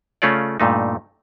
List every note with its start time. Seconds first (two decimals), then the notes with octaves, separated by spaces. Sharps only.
0.22 C#3 A3 C#4 F4 C#5 D5
0.60 G2 A#2 A3 D#4